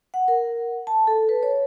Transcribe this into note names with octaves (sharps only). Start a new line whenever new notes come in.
F#5
A#4
A5
A4
B4
C#5